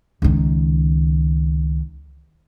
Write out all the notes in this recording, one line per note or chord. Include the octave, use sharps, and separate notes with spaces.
C#2 D#3